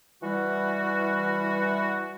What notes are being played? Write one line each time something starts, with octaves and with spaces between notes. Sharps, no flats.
E3 G3 F#4